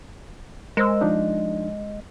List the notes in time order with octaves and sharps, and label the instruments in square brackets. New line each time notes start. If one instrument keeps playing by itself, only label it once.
[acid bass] G#3 [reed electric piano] A#4 C5 E6
[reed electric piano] F3 D4 D#4